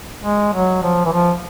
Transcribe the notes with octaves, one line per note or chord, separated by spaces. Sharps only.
G#3
F#3
F3
E3
F3